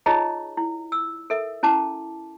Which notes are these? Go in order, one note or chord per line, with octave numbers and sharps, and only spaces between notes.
D#4 F4 G#4 C#5 D#5 A#5
E4
E6
A4 A#4 E5
C#4 E4 A5 D6